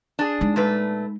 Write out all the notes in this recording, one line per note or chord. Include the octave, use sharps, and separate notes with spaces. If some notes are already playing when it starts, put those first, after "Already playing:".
D4 G#4
G#3 D#4
A#2 A3 B4